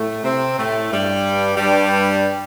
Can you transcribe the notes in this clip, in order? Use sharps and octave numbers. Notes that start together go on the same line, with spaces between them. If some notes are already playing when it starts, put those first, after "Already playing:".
Already playing: A2 A3
C3 C4
A2 A3
G2 G3
G2 G3